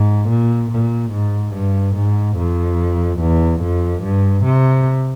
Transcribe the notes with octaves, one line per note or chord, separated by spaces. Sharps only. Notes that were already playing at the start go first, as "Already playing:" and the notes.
Already playing: G#2
A#2
A#2
G#2
G2
G#2
F2
E2
F2
G2
C3